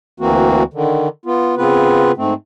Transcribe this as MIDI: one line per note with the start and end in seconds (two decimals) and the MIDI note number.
0.20 0.63 38
0.20 0.63 52
0.20 0.63 58
0.20 0.63 60
0.20 0.63 66
0.74 1.08 50
0.74 1.08 51
1.26 1.55 59
1.26 1.55 65
1.57 2.12 49
1.57 2.12 59
1.57 2.12 60
1.57 2.12 65
1.57 2.12 71
2.17 2.34 44
2.17 2.34 57
2.17 2.34 60